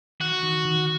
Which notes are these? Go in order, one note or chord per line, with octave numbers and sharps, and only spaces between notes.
D#3 F#4
D#3
D#3